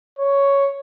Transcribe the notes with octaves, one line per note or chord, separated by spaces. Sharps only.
C#5